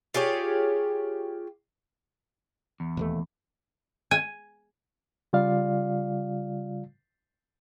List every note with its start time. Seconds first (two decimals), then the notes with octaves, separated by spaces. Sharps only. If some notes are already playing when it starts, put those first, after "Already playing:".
0.14 F4 G4 G#4 C#5
2.80 E2
2.97 E1 D#2 A3
4.11 G#5
5.33 C#3 G3 F4 D5 F5